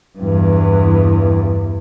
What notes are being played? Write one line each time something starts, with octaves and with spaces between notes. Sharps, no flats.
E2 G2